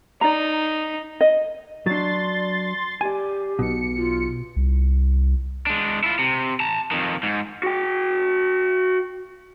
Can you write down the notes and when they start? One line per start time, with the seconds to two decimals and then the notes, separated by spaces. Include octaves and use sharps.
0.21 D#4 D5 A#5
1.21 D#5
1.86 F#3 D4 D5 C6 A6
3.01 G4 D5 G#5
3.59 B1 B2 C#7
3.97 F4
4.56 C2
5.67 G#3 D4
6.04 E4 F4
6.19 C3
6.60 A5 A#5
6.91 F2 D#3
7.23 G#2
7.63 F#4 G5